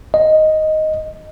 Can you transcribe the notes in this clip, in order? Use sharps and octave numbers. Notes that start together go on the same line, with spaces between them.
D#5